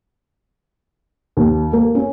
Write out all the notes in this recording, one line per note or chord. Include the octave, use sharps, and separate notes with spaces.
D#2
A#3
C#4